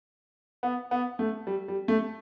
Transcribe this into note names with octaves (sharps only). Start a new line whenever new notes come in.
B3
B3
A3
G3
G3
A3